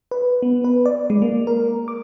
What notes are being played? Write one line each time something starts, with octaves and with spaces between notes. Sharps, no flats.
B4
B3
B4
D5
G#3
A#3
A#4
D6